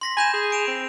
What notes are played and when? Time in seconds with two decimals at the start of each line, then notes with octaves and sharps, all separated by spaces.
0.01 C6 A#6 B6
0.17 G#5 B5 G6 E7
0.33 G#4
0.52 D7 E7 F7
0.68 C4